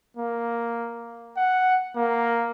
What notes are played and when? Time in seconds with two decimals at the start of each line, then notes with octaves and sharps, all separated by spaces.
0.17 A#3
1.37 F#5
1.96 A#3